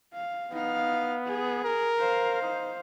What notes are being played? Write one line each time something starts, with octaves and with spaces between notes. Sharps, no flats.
F5
B3 D#4 F5
G#4
A#4
C5 F5
D#4